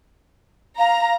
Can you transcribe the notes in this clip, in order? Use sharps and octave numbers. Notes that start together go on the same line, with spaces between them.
F5 A#5